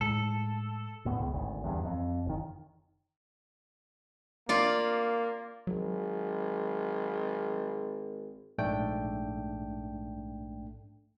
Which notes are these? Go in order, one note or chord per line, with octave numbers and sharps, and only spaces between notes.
A2 G#3 A4
D2 A2 B3
C#2
G#1 D2
E2 G2
F2
F#1 D#3
A#3 F4 D5
G#1 F#3
A#1 G#2 A3 D4 G5